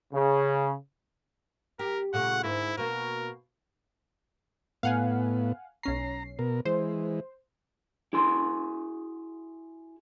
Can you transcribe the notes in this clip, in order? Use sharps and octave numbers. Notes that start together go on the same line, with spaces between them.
C#3
G4 A#4
A#2 C#3 A3 F#5
D2 G#2 A#3 E4
B2 A#3 A#4
A2 B3 F5 F#5 G#5
B1 C#4 A#5 C7
B2 A#4
E3 G#3 C5
E4 F#4 G#4 C6